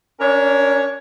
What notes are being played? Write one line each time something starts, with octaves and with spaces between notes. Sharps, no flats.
C#4 D4 A#4 C#5